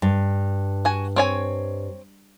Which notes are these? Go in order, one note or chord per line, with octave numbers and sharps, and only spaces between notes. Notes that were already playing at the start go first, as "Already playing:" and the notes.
G2
F#4 G#5
C4 C#5 G#5